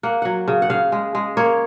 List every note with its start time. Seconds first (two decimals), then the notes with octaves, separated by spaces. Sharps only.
0.03 A#3 F#5
0.22 F#3 F#5
0.48 C#3
0.62 F#5
0.70 C#3 F5
0.92 G#3
1.15 G#3
1.37 A#3 C#5